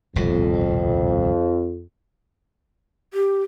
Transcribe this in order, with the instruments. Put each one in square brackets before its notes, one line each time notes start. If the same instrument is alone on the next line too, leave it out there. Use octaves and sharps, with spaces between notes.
[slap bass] D#1 C2 B2 [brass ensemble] F2
[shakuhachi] G4